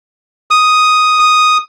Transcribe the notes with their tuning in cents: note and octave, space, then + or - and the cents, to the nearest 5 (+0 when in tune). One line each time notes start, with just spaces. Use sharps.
D#6 +5
D#6 +0